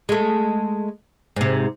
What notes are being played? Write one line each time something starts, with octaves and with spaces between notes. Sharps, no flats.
G#3 A3
G#2 C3